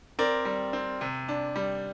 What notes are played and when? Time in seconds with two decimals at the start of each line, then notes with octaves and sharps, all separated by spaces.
0.19 C4 A#4 D5
0.45 G3
0.73 C4
1.01 C3
1.28 D4
1.56 G3